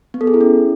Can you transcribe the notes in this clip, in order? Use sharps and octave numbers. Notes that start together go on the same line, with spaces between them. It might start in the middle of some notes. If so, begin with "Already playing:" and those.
B3
A4
G#4
E4
C#4